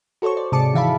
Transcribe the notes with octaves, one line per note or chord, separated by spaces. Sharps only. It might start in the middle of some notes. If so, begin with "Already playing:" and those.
F#4 A4 C5 C#5 C#6
D5
G#2 C3 G#4 A5 D6 C#7
D#3 E3 E5 F5 A5 B5